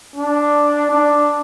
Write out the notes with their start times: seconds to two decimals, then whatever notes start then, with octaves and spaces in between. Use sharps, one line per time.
0.16 D4
0.91 D4